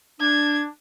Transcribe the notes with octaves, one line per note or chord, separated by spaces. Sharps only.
D4 G#6